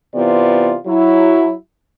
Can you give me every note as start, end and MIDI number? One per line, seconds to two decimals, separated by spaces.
0.15 0.75 48
0.15 0.75 52
0.15 0.75 59
0.15 0.75 65
0.15 0.75 74
0.87 1.53 54
0.87 1.53 64